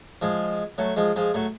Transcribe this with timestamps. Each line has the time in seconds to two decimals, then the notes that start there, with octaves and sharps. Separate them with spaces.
0.22 F3 G#3
0.78 F#3 A3
0.97 F3 G#3
1.16 F3 G#3
1.34 F#3 A3